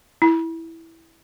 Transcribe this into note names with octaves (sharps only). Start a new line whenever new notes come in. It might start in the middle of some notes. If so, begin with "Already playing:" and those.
E4